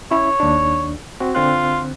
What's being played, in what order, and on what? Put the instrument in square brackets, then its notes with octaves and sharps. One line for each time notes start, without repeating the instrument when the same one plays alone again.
[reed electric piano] C#4 E4 [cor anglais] C#5
[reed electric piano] D#2 D4
C4 F#4
[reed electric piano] D3 C4 F#6 [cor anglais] F4